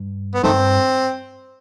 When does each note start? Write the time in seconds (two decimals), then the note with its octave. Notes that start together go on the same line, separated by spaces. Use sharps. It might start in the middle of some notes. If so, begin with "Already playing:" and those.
Already playing: G2
0.34 B3
0.43 G2 D#3 A3 C4